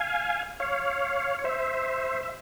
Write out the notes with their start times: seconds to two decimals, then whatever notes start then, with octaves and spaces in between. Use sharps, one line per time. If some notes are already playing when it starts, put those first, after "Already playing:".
Already playing: F5 G#5
0.60 C#5 F5
1.39 C#5
1.44 C5 E5
2.23 E5